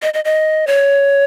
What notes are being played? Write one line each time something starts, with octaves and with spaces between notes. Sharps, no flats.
D#5
D#5
D#5
C#5